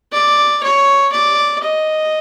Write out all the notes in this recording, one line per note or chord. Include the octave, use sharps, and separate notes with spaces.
D5
C#5
D5
D#5